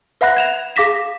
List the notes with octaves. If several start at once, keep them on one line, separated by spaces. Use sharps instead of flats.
B4 E5 F#5 B5 F#6 A#6
G#6 E7 F7
G#4 F5 D6 A#6 B6 E7